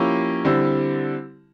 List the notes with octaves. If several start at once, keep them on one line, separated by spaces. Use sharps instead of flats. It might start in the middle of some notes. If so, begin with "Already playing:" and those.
Already playing: F3 A#3 C#4 E4 G4
D3 G3 C4 E4